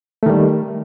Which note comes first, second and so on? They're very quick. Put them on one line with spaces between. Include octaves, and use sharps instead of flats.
A3 D#3 G3